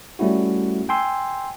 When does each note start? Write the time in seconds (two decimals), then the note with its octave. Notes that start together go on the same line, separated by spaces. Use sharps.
0.19 G3 A3 C#4 E4 F#4
0.89 G5 G#5 C6 E6